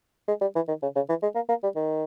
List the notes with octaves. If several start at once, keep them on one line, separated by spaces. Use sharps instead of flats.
G#3
G3
E3
D#3
C#3
C#3
E3
G#3
A#3
A#3
G3
D#3